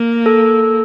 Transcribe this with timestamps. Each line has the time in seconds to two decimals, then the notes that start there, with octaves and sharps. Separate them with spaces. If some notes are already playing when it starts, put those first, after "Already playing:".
Already playing: A#3
0.26 A4